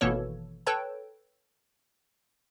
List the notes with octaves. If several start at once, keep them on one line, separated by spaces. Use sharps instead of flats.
G#1 B2 E3 A#3 A4 C#5
A4 B4 C#5 G5 A5